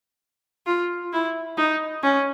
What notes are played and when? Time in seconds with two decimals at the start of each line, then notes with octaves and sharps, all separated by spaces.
0.66 F4
1.13 E4
1.57 D#4
2.03 C#4